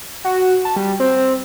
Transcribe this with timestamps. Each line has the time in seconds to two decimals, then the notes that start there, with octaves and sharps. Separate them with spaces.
0.25 F#4
0.65 A5
0.76 G3
1.00 C4